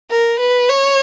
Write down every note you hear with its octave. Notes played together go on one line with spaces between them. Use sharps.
A#4
B4
C#5